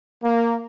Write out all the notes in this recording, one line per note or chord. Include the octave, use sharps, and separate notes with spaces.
A#3